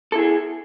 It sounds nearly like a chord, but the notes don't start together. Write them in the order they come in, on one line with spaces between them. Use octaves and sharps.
A4 E4 G#4